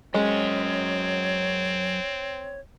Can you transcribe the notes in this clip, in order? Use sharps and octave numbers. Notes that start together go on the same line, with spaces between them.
F#2 G#3 C4 C#4 C#5